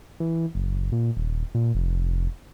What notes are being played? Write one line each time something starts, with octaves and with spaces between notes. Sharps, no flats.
E3
F#1
A#2
D#1
A#2
F1